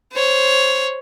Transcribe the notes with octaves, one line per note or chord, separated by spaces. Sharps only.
C5 C#5